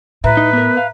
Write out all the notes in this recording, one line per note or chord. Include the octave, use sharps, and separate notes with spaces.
A2 B4 E5 A#5
D#4
B3 A#4
F5